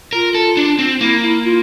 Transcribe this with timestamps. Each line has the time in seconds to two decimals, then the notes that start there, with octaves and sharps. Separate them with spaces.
0.13 F4 A#4
0.35 A4
0.57 D4
0.79 C4
1.00 A#3 E4
1.23 E4
1.44 F4